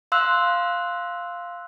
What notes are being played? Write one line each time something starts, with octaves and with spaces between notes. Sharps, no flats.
F5 C6 E6 F#6